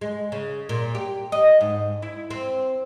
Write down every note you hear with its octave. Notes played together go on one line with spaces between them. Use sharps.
G#3
C#3
A#2
G4
D#5
G#2
E4
C4